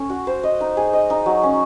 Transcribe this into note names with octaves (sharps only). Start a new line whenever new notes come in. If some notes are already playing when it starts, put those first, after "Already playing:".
Already playing: C#4 A4
F#4
C5
D#5
D#4
G#4
D#5
D#4
F#3
C#4